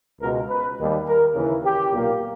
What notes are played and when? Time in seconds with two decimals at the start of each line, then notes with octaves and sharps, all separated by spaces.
0.20 C#2 B2 G#3 A#4
0.48 B4
0.77 D#2 D#3 G3
1.06 A#4
1.34 D#2 C#3 E3
1.63 G4
1.92 B1 A#2 A#3